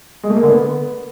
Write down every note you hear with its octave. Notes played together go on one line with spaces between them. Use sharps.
G#3
A3
A#3
D3
B3